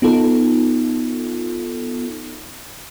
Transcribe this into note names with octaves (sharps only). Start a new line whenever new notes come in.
B3 D#4 F4 A4